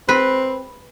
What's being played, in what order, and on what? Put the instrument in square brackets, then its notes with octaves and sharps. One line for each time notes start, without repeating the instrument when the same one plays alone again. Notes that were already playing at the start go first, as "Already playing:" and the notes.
[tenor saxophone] C4 [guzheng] B4